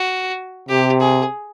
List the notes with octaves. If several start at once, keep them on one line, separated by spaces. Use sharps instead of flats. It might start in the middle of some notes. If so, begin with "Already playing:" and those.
Already playing: F#4
C3 G4
G#4